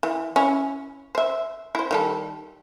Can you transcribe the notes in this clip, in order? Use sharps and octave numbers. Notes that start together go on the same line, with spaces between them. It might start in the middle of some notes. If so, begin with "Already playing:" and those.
E3
C#4 E4
C5 E5
E4 C5
D#3 G3 A4